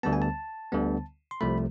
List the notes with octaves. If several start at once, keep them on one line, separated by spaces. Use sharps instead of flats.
D2 D3 G3 B3 A5
G#5
A5
D2 D3 G3 B3
C6
C2 C3 F3 A3 B5